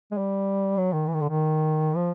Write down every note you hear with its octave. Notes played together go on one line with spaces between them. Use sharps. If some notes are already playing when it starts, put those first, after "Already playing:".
G#3
G3
F#3
D#3
E3
D#3
D3
D#3
F3